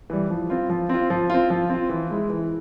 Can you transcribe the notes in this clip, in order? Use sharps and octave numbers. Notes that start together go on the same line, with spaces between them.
E3 G3
F3
C4 F4
F3
C4 F4
F3
C4 F4
F3
C4 F4
E3
G#3 E4
E3